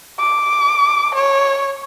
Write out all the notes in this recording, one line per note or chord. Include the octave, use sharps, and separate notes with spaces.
D6
C#5